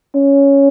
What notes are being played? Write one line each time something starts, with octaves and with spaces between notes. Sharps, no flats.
C#4